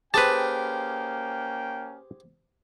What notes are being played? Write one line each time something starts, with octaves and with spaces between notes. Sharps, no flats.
A#3 C#4 G4 G#4 B4 C5 G5 A5